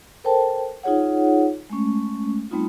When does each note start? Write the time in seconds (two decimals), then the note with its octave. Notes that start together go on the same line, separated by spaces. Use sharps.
0.24 A4 A#4 C5 G5 A5
0.83 D#4 F4 G#4 C#5 F#5
1.70 G#3 A3 C#4
2.51 G3 A3 B3 C4 D#4 F4